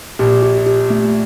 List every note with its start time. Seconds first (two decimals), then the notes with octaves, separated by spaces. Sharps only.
0.19 A#1 A#2 G4
0.43 G4
0.66 G4
0.90 A3